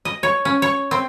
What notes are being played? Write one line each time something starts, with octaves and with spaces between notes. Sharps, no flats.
D#5
C#5
C#4
C#5
C4